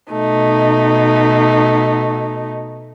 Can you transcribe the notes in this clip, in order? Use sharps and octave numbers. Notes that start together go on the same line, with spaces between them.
B2 A3 D#4